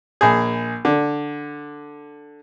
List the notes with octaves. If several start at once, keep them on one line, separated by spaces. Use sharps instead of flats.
A#1 G#4
D3